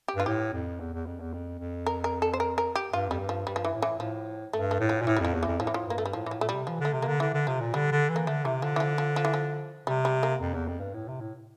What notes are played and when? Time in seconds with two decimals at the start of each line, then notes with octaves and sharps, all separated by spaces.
0.08 G4
0.16 G2 F4
0.26 A2 G4
0.53 F2
0.80 E2
0.93 E2
1.06 F2
1.20 E2
1.33 F2
1.59 F2
1.86 A#4
2.04 A#4
2.22 A4
2.33 C5
2.40 A#4
2.58 A#4
2.75 G4
2.93 G2 F4
3.09 F2 G3
3.20 G2
3.29 F3
3.47 G2 G3
3.56 F3
3.64 E3
3.74 A2
3.82 E3
3.99 A2 F3
4.53 G2 A3
4.71 A3
4.80 A2
4.89 F3
5.01 A#2
5.07 A2 E3
5.16 G3
5.20 F2 F3
5.34 E2
5.43 F2 E3
5.60 A2 F3
5.67 E3
5.74 F3
5.87 G2 A#3
5.98 A3
6.06 G3
6.13 A2 F3
6.26 A2 E3 F3
6.41 A#2 A3
6.49 C3 G3
6.67 E3 F3
6.80 D3
6.85 A3
6.93 C3
7.02 D3 A#3
7.20 D3 E3
7.34 D3
7.47 C3 F3
7.60 A#2
7.74 D3 G3
7.92 D3
8.09 E3
8.16 A#3
8.27 D3 A3
8.44 C3 E3
8.62 D3 F3
8.76 E3
8.80 F3
8.98 F3
9.16 F3
9.25 E3
9.34 F3
9.87 C3 G3
10.05 G3
10.23 A#3
10.41 F2
10.54 E2
10.68 F2
10.80 G2
10.94 A2
11.08 C3
11.20 A2